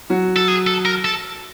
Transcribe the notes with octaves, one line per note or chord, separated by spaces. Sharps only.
F#3 F#4
A4
G#4
A4
A#4
A4